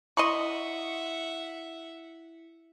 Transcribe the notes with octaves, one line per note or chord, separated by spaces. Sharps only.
E4 D#5 E5 F#5 C6 C#6 C#7 F#7